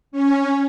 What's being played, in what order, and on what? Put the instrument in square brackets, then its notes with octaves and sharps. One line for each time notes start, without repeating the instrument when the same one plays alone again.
[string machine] C#4